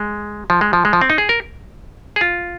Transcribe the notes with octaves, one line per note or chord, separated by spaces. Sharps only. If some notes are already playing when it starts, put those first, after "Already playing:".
Already playing: G#3
F3
G#3
F3
G#3
F3
C4
D#4
G#4
A#4
G#4
F4